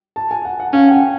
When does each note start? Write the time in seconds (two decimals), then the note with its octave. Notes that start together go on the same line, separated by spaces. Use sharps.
0.16 A5
0.31 G#5
0.45 F#5
0.60 F#5
0.73 C#4 F5
0.88 G5
0.92 F#5